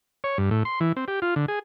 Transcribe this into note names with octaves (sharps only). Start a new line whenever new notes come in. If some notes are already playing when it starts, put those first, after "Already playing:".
C#5
G2
A2
C6
E3
C4
G4
F4
D3
G#4